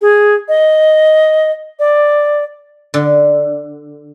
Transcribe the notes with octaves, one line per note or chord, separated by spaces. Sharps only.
G#4
D#5
D5
D3